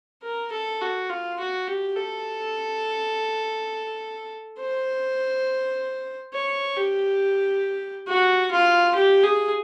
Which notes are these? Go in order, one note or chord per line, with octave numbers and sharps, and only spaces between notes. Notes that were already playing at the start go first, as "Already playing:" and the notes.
A#4
A4
F#4
F4
F#4
G4
A4
C5
C#5
G4
F#4
F4
G4
G#4